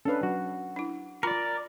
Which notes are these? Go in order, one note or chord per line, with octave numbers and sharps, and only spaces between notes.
C#4 D4 A4 B4 F5
F#3 F#4
D4 E4
F4 A#4 D5 A#5 B5